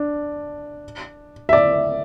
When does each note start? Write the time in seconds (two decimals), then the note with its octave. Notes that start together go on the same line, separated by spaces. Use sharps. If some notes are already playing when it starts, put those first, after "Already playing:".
Already playing: D4
1.49 E5
1.53 D5